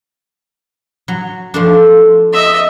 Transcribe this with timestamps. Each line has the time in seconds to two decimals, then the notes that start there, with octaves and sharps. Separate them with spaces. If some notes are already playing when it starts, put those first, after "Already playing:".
1.08 F#3
1.54 F3 A3 D4
2.33 D#5 E5